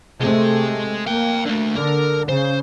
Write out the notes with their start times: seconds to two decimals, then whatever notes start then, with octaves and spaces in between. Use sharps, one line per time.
0.21 C3 G#3 A3 G#4
1.06 A#3 F5 G5
1.46 D3 A3
1.76 D3 A#4
2.29 C#3 C5